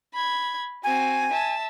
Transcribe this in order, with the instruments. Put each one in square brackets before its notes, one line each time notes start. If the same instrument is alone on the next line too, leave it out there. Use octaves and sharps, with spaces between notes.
[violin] B5 G#6
[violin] C4 F#4 [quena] G#5
[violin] E5 A5